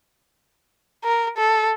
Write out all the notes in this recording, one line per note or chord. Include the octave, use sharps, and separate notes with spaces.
A#4
A4